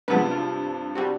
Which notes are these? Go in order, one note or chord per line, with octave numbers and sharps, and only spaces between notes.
G2 C3 F3 G#3 B3 B4
F4
G3 C4 F#4